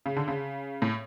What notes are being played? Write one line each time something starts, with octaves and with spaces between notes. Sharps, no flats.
C#3
D3
C#3
A2